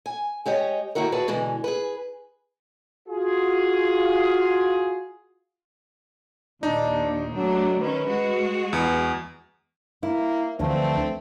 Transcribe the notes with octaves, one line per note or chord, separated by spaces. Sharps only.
G#5
G#3 G4 C#5 D#5
D#3 A#3 E4 F#4 A#4
F#4 G#4 B4 D5 A5
B2 D3 E3 G#3
G#4 B4
F4 F#4 G#4
D#2 A#2 D4 D#4
F#3 A3 D4
D#3 C#4 B4
G#3 F#4
E2 B4
A#3 E4
D2 D3 E3 F3 A3 C4 D4